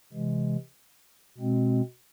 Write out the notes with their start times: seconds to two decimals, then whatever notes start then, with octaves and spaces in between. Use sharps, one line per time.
0.13 C3 E3 G#3
1.37 B2 G#3 C4